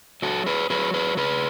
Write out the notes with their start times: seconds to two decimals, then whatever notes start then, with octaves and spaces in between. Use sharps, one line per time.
0.22 F#3 F#4 A4
0.46 G#4 B4
0.70 F#3 G#4 B4
0.94 G#4 B4
1.17 C#3 G#4 B4